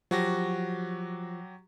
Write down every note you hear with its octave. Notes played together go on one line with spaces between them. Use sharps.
F3 F#3 F#4 G4 A#6